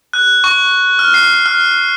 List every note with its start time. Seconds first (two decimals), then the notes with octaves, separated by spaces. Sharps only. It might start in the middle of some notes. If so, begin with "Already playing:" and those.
0.13 F#6
0.44 C#6
0.99 F6
1.14 C7
1.46 F6